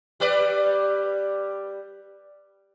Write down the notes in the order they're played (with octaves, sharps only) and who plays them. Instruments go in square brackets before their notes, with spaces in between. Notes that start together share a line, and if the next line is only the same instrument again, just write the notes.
[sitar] G3 B4 D5